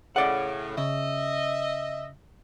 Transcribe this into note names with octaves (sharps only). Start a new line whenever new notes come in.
A2 C#3 D5 F#5
C#3 D#5 E5